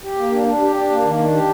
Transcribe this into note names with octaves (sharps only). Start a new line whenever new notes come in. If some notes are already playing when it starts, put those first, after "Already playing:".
G4
A#3
D4
D4
G4
D4
A#3
D#3
D4
G4